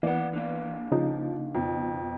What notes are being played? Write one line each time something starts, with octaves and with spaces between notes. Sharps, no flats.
E3 A#3 B3 D5 F#5
D3 A#3
C#3 F3 D#4
F2 B2